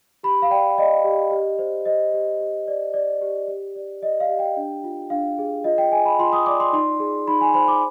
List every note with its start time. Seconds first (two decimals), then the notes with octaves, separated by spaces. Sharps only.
0.23 G4 B5
0.42 F5
0.50 D5 G5
0.78 D5 D#5
1.04 G4
1.31 G4
1.59 C5
1.86 C5 D#5
2.14 G4
2.40 G4
2.68 D5
2.94 D5
3.22 G4
3.48 G4
3.76 D5
4.02 D5 D#5
4.20 F5
4.29 G4
4.39 G5
4.57 D4
4.84 F4
5.10 D4 F5
5.38 G#4
5.64 F4 D#5
5.78 G5
5.92 G#4 G#5
6.05 B5
6.19 F4 C6
6.33 D#6
6.46 D5 D6
6.60 C6
6.73 D#4 C6
7.00 G#4
7.27 D#4 B5
7.41 G#5
7.54 C5 B5
7.68 D6